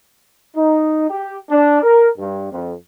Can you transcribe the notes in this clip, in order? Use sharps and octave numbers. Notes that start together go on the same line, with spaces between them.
D#4
G4
D4
A#4
G2
F2